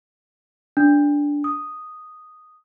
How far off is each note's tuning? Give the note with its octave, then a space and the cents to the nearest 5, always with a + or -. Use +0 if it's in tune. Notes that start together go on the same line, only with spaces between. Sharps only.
D4 -10
D#6 -5